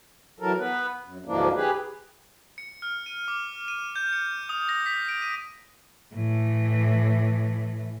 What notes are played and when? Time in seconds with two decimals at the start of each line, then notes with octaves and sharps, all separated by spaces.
0.40 E3 F#3 A4 A#4
0.58 B3 B4
1.04 F#2
1.26 D2 G#2 E3 F3 A#3 D4
1.55 G4 G#4 B4
2.58 C#7
2.82 F6
3.06 D#7
3.28 D6
3.68 D#7
3.96 G6
4.13 C#7
4.49 D#6
4.69 A#6
4.86 B6
5.09 D7
5.22 D#7
6.14 A2 E3